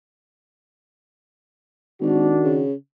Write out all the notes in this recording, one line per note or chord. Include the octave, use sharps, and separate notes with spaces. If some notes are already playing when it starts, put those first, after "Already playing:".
G#1 D#3 D4 F#4
C#3